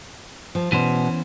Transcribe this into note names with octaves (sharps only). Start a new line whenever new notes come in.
F3
B2 E3 C#4 C5